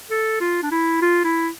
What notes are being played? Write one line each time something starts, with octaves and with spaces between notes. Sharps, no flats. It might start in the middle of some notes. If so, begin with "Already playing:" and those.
A4
F4
D4
E4
F4
E4